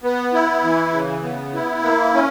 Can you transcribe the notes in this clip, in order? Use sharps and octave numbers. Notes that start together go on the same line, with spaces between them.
B3
E4
E3
C#3
B3
E4
A#3
C#4